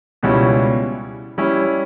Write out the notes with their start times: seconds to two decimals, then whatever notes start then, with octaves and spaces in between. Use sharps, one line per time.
0.23 C#2 B2 G3 C#4 E4
1.38 G3 C#4 E4